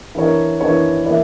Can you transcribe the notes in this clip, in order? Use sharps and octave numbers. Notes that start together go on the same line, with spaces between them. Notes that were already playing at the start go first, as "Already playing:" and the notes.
E3 B3 D4 A#4 C#5
E3 B3 D4 A#4 C#5
E3 A#3 E4 B4 D5